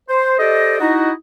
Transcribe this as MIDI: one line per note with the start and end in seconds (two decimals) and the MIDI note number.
0.09 0.36 72
0.39 0.79 67
0.39 0.79 69
0.39 0.79 72
0.39 0.79 74
0.39 0.79 75
0.80 1.11 63
0.80 1.11 64
0.80 1.11 66
0.80 1.11 75